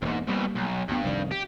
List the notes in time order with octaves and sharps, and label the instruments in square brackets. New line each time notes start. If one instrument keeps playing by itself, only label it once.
[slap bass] E1 A#3 [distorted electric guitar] F2 G#2
[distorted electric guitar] C2 B2 [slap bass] G3 A#3
[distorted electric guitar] B1
[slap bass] D2 B3 [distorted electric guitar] G2
[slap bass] F1 C2 D#3
[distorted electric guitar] G4